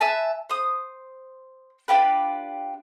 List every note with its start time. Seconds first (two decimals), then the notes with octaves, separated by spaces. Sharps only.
0.01 B4 E5 G#5 A5
0.49 C5 D#6
1.88 D4 F4 G4 B4